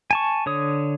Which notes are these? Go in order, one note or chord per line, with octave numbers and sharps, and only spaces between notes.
G#5 A5 C#6
D3 C#5 D#6